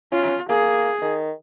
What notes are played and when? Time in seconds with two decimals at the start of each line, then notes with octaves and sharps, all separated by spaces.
0.12 C#4 F4
0.49 A#3 G#4
1.02 D#3